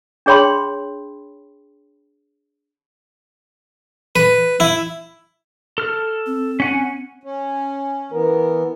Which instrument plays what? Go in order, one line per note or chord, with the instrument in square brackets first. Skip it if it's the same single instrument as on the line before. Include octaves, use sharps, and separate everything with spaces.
[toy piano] D4 G#4 C#5 G5 B5 C6
[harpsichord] B4
E4
[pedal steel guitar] A4 F6
[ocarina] C4
[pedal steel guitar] C#4 F#5 G#5
[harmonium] C#4
[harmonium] E3 B3 [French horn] A#4